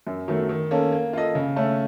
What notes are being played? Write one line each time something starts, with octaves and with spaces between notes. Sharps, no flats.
F#2
D#3 F#3 A3
D#3
A#3 C#4 A4
A#3
F4 A4 D#5
C#3
A3 C#4 A4